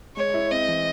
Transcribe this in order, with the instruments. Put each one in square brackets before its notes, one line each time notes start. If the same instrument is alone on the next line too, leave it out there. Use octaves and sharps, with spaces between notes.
[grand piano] G#3 [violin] C#5
[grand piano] E4
[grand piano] C4 [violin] D#5
[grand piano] E3